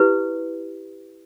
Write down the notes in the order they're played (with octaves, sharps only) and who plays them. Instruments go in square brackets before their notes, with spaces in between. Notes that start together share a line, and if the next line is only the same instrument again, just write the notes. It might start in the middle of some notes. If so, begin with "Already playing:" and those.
Already playing: [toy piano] E4 G4 B4